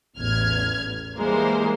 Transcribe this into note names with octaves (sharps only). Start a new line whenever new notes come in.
A1 E2 F6 G#6
E3 G3 G#3 A#3 A#4 C5